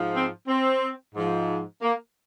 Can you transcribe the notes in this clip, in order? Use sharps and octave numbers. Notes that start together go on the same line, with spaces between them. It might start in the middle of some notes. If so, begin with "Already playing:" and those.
Already playing: G#2 F3
C4
C4
G#2 F3
A#3